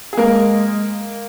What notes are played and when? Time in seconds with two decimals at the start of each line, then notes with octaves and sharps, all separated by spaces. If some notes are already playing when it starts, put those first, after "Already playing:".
0.13 G#4
0.17 G#3 A#3 A#4